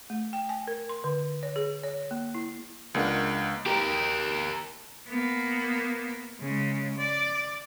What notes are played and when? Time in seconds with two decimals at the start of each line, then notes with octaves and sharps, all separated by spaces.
0.10 A3
0.33 G5
0.49 G#5
0.67 A#4
0.89 C6
1.04 D3
1.43 C#5
1.56 G#4
1.83 C#5
2.11 A#3
2.35 E4
2.94 C#2 G#3 A#3 D4 A#4 F#5
3.67 G4 A#4
5.08 A#3 B3
6.41 C#3 G#3
6.98 D5